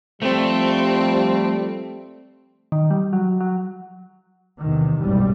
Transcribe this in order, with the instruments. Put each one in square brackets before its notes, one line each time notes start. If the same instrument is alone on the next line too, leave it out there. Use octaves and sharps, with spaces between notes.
[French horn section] F3 G3 [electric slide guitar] A3 [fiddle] C4
[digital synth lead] D#3
G3
F#3
F#3
[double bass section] E2 C3 D#3
F#1 B1 G#2 G3